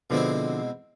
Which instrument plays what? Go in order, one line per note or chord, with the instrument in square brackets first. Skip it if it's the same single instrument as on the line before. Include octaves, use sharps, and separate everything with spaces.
[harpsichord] B2 G#3 C4 E4 [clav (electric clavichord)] D3 F3